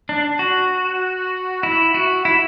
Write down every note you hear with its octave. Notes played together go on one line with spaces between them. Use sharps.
D4
F#4
E4
F#4
E4